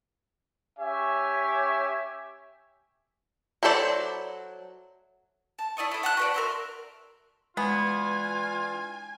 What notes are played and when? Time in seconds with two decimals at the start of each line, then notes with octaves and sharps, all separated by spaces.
0.79 C#4 G4 C#5 E5 G#5
3.63 F#3 E4 A4 C5 D5
5.59 A5
5.77 E4 D5 D#5 C#6
5.91 E4 A4
6.03 F#5 A5 F#6
6.17 F#4 B4 D5
6.34 A#4 E5 C6
7.57 E3 G#3 B3 D4 F4 G#5